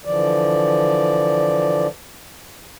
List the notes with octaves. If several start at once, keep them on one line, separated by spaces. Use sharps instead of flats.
D3 E3 F3 D5